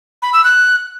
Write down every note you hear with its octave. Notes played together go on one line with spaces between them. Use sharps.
B5
E6
F#6